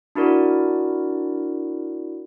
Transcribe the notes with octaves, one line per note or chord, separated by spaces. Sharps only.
D4 E4 F#4 A#4 D5